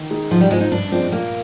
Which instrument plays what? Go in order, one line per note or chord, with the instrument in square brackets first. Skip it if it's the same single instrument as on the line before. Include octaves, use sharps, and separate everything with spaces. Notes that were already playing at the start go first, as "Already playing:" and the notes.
Already playing: [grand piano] D#3
G#3 D#4 G#4
[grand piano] G#2 [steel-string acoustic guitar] F3
[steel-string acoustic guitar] G3
[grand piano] F3 C4 [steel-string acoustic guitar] G#3
[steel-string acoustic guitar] D#4
[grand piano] G2 [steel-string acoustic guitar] D4
[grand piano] F3 G#3 D4 [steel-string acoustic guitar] C4
[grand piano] A#2 [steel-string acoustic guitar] A#3